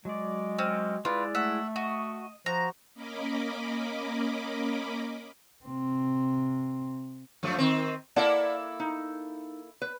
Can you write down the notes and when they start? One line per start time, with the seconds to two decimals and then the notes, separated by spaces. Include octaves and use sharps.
0.05 F#3 G#3 D5
0.58 C4 C#4
1.05 G#3 E4 F4 B4 D5
1.35 A3 E5 F#5
1.76 F#4 D#5
2.46 F3 F#4 A#5
2.94 A#3 C#4 A#4 D#5 B5 D6
5.65 C3 C4
7.43 F#2 F3 A3
7.58 D#3 C4
8.16 A#3 E4 A4 D5 F#5 A5
8.80 D#4
9.82 B4